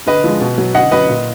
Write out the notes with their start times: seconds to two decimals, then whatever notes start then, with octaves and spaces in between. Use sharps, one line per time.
0.07 D3 B4 D#5
0.24 F3 G#3
0.41 B2
0.58 F#3
0.75 D3 D#5 F#5
0.91 F#3 B4 D#5
1.09 A#2